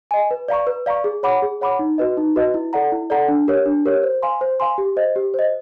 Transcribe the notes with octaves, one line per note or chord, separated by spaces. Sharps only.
D#5 G#5
B4
D5 F5 A#5 C#6
B4
D5 F5 A#5 C#6
G#4
C#5 F#5 B5 D6
G#4
C#5 F#5 B5 D6
D#4
F#4 B4 D#5
D#4
F#4 B4 D#5
E4
A4 D5 F#5 A#5
E4
A4 D5 F#5 A#5
D4
G4 A#4 C#5
D4
G4 A#4 C#5
C5
F5 G#5 C6
C5
F5 G#5 C6
G4
C5 D#5
G4
C5 D#5